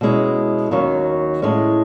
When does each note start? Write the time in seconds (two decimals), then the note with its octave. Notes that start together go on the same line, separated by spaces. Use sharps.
0.01 B2 G#3 C#4 E4
0.71 D#2 D#3 F#3 C#4
1.42 A2 G#3 C#4